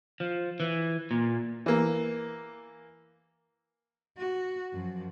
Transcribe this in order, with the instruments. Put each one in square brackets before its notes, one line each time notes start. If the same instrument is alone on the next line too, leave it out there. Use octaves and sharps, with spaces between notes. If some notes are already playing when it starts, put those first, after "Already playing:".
[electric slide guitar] F3
E3
A#2
[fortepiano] E3 A#3
[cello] F#4
F#2 F3